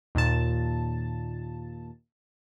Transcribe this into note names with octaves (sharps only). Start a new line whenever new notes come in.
D#2 A#2 A5